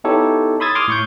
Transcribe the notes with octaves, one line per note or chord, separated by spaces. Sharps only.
B3 D#4 E4 G4 A4 C#5
B5 C6 D#6 E6 G#6 A6
C6 D6 D#6 F6 G#6
A2 C#6 G6